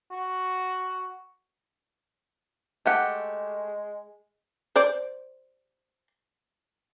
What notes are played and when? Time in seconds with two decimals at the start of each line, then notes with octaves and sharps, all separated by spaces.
0.11 F#4
2.86 G#3 A3 G4 F#5
4.76 C5 D5